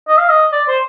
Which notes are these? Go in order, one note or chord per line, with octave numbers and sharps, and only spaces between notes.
D#5
F5
D#5
D5
C5